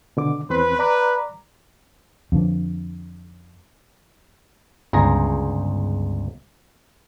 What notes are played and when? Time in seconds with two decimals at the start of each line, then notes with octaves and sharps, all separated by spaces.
0.17 B2 D3 D6
0.50 E2 C4 B4 C6
0.79 D5 A#5 D6
2.32 F2 D3
4.93 G1 C#2 G#4 A#5